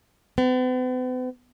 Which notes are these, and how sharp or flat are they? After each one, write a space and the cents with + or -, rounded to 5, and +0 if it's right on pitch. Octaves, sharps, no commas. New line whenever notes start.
B3 +45